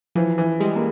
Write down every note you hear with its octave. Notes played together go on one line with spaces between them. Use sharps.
E3 F3
E3
G3 G#3
A#3